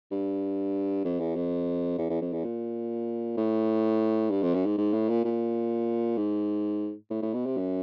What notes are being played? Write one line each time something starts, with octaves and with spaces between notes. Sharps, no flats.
G2
F2
E2
F2
E2
E2
F2
E2
A#2
A2
G2
F2
F#2
G#2
G#2
A2
A#2
A#2
G#2
A2
A2
B2
C3
F#2